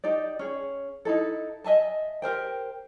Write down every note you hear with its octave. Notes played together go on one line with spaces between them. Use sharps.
D#4 G4 D5
C#4 G#4
D#4 E4 A4
D#5 E5 G#5 A5
G4 A#4 C5 G5